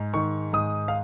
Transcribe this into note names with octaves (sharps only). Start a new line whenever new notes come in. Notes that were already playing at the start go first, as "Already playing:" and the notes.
Already playing: G#2 G#3
D#3 C#6
G#2 D#6
F5